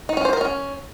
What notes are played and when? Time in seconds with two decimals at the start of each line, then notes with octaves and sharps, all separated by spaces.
0.09 D#4
0.17 C#4
0.25 C5
0.33 A#4
0.41 C#4